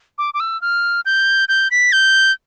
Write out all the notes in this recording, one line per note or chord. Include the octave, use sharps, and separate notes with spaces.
D6
D6
E6
F6
G6
G6
B6
G6